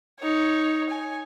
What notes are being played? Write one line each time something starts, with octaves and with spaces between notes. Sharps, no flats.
D#4 C#5
G#5